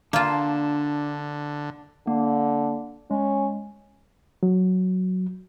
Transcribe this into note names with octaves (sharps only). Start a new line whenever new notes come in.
D3 A#3 D4 F4 A5
D3 A#3
G#3 C#4
F#3